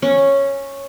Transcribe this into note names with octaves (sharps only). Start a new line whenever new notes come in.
C#4